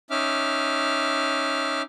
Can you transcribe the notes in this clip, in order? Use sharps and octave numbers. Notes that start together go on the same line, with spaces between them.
C#4 D#4 E5 D6 F6